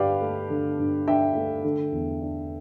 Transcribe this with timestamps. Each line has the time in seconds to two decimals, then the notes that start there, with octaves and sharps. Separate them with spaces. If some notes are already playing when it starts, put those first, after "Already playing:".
Already playing: G2 D3 D4 G4 B4 D5 F5
0.22 A3
0.50 D3
0.79 G2
1.07 D4 E5 G5
1.35 A3
1.65 D3
1.92 E2
2.21 D4